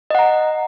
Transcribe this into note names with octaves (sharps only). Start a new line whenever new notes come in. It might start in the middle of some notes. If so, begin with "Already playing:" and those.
D#5 F#5 A#5